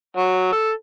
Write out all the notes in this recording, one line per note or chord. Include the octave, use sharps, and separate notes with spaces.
F#3
A4